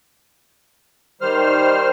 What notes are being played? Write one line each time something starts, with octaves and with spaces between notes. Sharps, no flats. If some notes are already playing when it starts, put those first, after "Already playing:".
D#3 G3 C5 F6